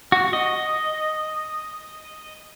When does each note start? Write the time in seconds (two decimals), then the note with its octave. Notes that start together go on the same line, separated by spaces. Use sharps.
0.12 F#4
0.33 D#5